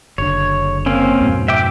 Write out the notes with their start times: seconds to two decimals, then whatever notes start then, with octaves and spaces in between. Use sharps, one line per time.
0.18 F#1 D3 C#5
0.86 A#3 C4 C#4
1.20 F2 G#2 B2
1.48 E5 G5 D6